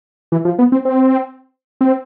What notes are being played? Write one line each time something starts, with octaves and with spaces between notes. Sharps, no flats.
E3
F3
B3
C4
C4
C4